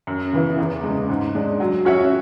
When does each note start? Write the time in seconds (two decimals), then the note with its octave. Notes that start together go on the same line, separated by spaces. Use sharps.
0.07 F#2
0.33 C#3 E3 B3 E4
0.59 E2
0.84 C#3 G#3
1.10 G#2
1.35 G#3 D4
1.60 F#3
1.85 C#4 F#4 C#5 E5